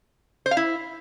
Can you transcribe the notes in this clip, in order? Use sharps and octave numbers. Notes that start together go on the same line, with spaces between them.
C5
F5
E4